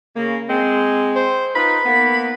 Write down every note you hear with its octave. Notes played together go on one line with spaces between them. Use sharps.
C#3 A#3
G#3 C4
C5
D#4 F4 B4 B5
A#3 B3